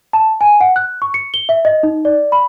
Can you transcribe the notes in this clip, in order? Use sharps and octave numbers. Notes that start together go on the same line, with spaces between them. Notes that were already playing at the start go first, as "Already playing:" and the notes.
A5
G#5
F#5
F#6
C#6
C#7
G7
E5
D#5
D#4
D5
B5